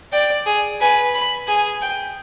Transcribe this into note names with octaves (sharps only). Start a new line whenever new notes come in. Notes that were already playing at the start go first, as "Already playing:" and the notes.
D5 G5
G#4
B4 G#5
B5
G#4 G#5
G5